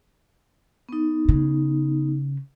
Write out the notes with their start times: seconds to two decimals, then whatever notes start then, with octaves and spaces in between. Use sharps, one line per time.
0.89 B3 D#4
1.29 C#3